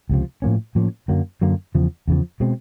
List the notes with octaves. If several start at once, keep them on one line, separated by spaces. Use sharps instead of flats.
C#2 C3 F3
A2 F3 A#3 C#4
A2 F3 A#3 C#4
F#2 D3 F#3 A#3
F#2 D3 F#3 A#3
E2 C#3 F3
E2 C#3 F3
B2 G#3 C4